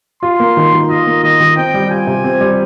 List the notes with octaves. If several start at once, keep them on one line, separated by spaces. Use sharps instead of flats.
F4 C6
A#3
D#3
D#3
F4 D#5
A#3
D#3 D#5
D#3
C4 G5
G3
F4 G#5
C3
C4
G3